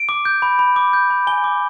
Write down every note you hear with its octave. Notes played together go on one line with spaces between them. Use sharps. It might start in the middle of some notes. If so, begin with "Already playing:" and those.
Already playing: D7
D6
G6
B5
B5
D6
G6
B5
G#5 G7
D6